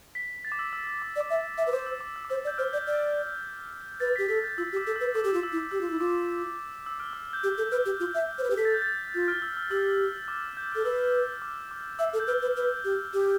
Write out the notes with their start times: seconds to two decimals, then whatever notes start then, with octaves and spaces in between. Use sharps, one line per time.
0.15 B6
0.45 A6
0.52 D6
0.59 E6
0.73 E6
0.87 E6
1.02 D6
1.16 D5
1.21 D6
1.30 E5
1.58 E5
1.64 B4 E6
1.72 C5 D6
1.86 E6
2.01 D6
2.16 E6
2.25 D6
2.30 C5 E6
2.45 D5
2.47 G6
2.58 C5 F6
2.73 D5 G6
2.87 D5
4.00 B4 A6
4.16 B6
4.18 G4
4.29 A4 B6
4.43 G6
4.58 F4 E6
4.72 G4
4.77 D6
4.87 A4
4.96 E6
5.00 B4
5.14 A4 D6
5.24 G4
5.29 E6
5.34 F4
5.43 E6
5.52 E4
5.58 E6
5.71 G4 E6
5.81 F4
5.91 E4
5.99 F4 D6
6.86 E6
7.00 F6
7.13 E6
7.33 G6
7.43 G4 F6
7.58 A4 G6
7.72 B4 F6
7.86 G4
8.00 F4
8.14 E5
8.38 C5
8.43 B4
8.51 G4
8.57 A4 B6
8.65 A6
8.74 G6
8.82 A6
9.14 F4 G6
9.28 F6
9.42 E6
9.57 E6
9.71 G4 E6
10.28 D6
10.57 G6
10.72 A4 F6
10.85 B4 E6
11.42 D6
11.71 D6
11.99 E5 E6
12.13 A4
12.20 G6
12.27 B4 F6
12.42 B4
12.57 B4
12.85 G4
13.14 G4